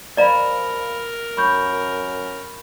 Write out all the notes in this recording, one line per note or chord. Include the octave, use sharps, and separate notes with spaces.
F3 A#4 D5 D#5 F5 A#5 B5
F#2 B5 C#6 G6